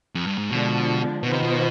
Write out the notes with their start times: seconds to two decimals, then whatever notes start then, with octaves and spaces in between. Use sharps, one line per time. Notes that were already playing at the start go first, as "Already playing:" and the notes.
0.15 F2
0.27 G2
0.38 G#2
0.50 B2 D3 F3 G#3 D4
1.23 B2 D#3 B3 F4 C5 D#5
1.33 C3
1.43 B2